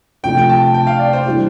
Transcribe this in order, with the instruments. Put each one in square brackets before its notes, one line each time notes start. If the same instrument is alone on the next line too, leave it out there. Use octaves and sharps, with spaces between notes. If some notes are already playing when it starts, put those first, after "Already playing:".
[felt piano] C3 F3 A3 D4 [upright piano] G5
[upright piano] G5
A5
G5
F5
D5
C5
[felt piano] E3 G3 D4